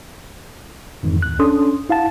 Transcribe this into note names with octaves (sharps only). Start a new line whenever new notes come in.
F2 G#2 D#3 E3
D2 F#6
C#4 D4 A4 C6 D#6
E4 F5 F#5 A5